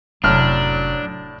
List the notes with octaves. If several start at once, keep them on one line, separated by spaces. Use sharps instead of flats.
F1 A2 F#3 C#4 D4 F6